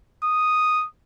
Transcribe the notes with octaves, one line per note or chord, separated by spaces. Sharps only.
D#6